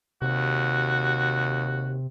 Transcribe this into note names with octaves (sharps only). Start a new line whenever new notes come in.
D#2 C3 F#4